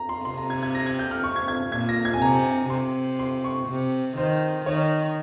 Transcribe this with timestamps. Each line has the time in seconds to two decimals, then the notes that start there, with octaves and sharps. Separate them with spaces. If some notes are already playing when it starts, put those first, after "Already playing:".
Already playing: A#5
0.09 C6
0.25 C3 C6
0.38 A#5
0.50 G#6
0.63 G#6
0.75 A#6
0.86 G#6
0.99 G6
1.11 F6
1.24 C#6
1.36 G#6
1.48 G#6
1.72 A#2 G#6
1.89 A#6
2.05 G#6
2.14 G#5
2.22 C3 A#5
2.70 C3 C6
3.19 C6
3.44 C#6
3.68 C3
4.17 D#3 C5
4.66 D#3 C#5